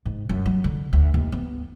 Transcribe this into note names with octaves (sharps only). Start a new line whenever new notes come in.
G#2
F#2
F#3
D3
D2
D#2
B3